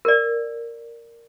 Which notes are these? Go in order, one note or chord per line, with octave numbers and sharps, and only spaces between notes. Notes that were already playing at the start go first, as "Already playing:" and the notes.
A#4 D5